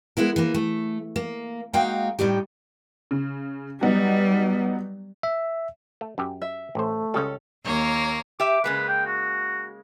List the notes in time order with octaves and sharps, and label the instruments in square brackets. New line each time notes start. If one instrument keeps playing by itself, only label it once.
[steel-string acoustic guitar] G#3 B3 E4 A#4
E3 A#3
A3
A#3
G#3 A#3 D#4 F#4 F5 G5
A2 G3 D#4 G4
[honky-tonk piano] C#3
[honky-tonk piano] F#3 B3 D#4 [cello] G3
[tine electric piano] E5
[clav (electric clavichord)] A3
F#2 G4
[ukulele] E5
[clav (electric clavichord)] A1 C5 [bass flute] A3
[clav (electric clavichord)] C#2 C#3 G3 [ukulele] C#4 A4
[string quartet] D#2 A#3 C#5
[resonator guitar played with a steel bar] G4 E5 [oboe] D6
[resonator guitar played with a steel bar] C#3 G#3 A#3 [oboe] B4
[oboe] G5
F#4